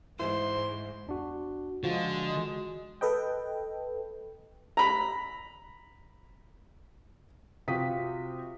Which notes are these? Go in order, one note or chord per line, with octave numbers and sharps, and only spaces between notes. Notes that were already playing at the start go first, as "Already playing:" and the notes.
G#2 E3 G#3 C5 C6
E2 D4 F#4
D3 F3 G#3 F4 F#4
A4 B4 D#5 G5
A#5 B5
C3 F4 F#4 G5 D#6 B6